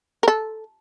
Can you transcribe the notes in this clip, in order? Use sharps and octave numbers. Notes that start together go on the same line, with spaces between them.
A4 A#4